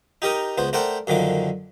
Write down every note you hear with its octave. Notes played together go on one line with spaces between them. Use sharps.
D#4 G4 A#4 D#5
C#2 B3 C5
A3 A#4 C5 D5 F#5 G5
F#2 D3 D#3 F3 D6